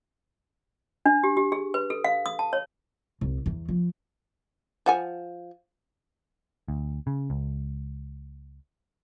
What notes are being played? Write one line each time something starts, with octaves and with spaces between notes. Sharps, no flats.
D4
G4
G4
G#4
B4
A4
F5
D#6
A5
C#5
C2
E2
F3
F3 F#5 G#5
D2
C#3
C#2